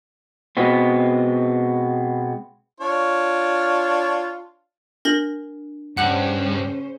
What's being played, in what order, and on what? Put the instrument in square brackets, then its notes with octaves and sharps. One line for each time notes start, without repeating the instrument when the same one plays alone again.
[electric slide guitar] B2 G#3 B3 C4
[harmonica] D4 F4 C#5
[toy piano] D4 [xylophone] A#4 A#6 F#7
[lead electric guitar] G2 [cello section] C#3 C#4 C5 [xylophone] F#5 F#6 F#7